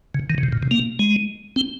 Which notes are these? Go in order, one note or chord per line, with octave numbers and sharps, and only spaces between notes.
C#3
D#3
C#3
C3
A#2
C3
A#3
G#3
C4